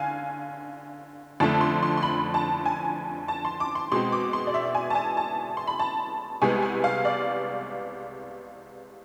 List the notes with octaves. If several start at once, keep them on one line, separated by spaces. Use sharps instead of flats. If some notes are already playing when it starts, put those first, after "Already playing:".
Already playing: D3 F5 G#5
F2 D3 A3 A5
C6
C6
C6
B5
A5
G#5
A5
C6
D6
C6
B2 G#3 C4 C6
D6
C6
D5
E5
G#5
A5
G#5
A5
C6
B5
A5
C2 C3 G#3 B3 G#5
G#5
F5
D5